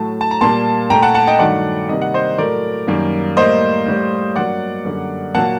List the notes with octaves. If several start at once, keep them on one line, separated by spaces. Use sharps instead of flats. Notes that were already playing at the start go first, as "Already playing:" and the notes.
Already playing: A2 F#3 A3 A5
A5
A#5
A#2 G3 A#3 A5 C6
A#2 A3 G5 A#5
F#5 A5
F#5 A5
D#5 G5
G2 D#3 F#3 A3 D5 F#5
C3 D#3 G3 A#3 D#5
F#5
C5 D#5
A2 F#3 A3 A#4 D5
F#2 D#3 G3 A#3
A2 G3 A#3 C5 D#5
A2 G3 A#3
G2 F#3 A#3 D5 F#5
F#2 D3 G3 A#3
A#2 F#3 A#3 F#5 A5